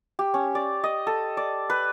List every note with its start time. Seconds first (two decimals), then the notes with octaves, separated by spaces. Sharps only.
0.19 G4
0.34 C#4
0.55 D5
0.84 D#5
1.07 A4
1.37 D5
1.70 B4